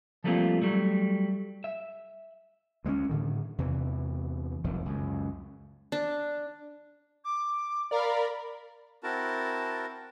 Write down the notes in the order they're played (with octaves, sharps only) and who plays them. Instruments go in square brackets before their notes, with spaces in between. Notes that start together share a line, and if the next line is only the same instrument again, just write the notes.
[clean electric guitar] F3 G3 A3 A#3 C4 F4
F#3 G3 A3
E5
[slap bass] D2 G#3 A#3 C#4
A2 D3 D#3
E2 C3 E3
F1 B1 F2 D#3
C#2 F#2
[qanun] D4
[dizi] D6
[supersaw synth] A#4 B5 [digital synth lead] D5 [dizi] F5
[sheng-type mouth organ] C4 E4 F#4 A#4 A5